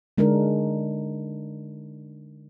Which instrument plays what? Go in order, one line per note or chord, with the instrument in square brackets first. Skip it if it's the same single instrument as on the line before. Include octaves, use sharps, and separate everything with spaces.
[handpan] D3 G#3 D4 D#4 A#4